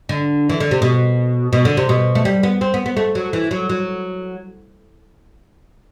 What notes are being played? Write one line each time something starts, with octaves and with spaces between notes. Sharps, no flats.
D3
E3
D3
C3
B2
B2
D3
C3
B2
A3
G3
B3
C4
B3
B3
A3
F#3
E3
F#3
F#3